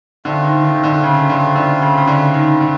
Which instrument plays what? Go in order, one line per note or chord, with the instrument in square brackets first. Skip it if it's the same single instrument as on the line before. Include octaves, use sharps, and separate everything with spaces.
[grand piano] D3 [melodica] A3 C4 F4
[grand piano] D#3
D#3
D#3
D3
C#3
D3
D3
C#3
C#3
D3
D#3
D3